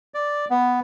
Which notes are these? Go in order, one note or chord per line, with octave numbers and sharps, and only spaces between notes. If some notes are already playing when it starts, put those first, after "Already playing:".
D5
B3